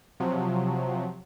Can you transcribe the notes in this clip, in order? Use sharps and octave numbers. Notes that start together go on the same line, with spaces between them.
C3 F3 F#3